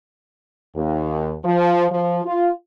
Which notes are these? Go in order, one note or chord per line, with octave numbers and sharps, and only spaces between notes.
D#2
F3
F3
F4